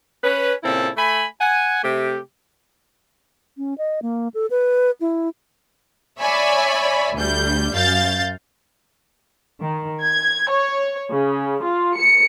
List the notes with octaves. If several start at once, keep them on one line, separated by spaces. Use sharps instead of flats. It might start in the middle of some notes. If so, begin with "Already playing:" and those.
C#4 B4
A#2 C#3 C4 E4 A4
A3 G#5 B5
F#5 G#5
C3 A3 G4
C#4
D#5
A#3
A4
B4
E4
C#5 D5 E5 G#5 B5
D2 G3 G6
F#2 F5 G6 A6
D#3
G#6
C#5
C#3
F4
C#7